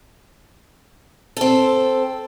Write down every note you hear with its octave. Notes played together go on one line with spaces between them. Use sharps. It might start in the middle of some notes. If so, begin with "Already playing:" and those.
C4 A4